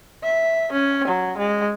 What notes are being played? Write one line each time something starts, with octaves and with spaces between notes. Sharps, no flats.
E5
C#4
F#3
G#3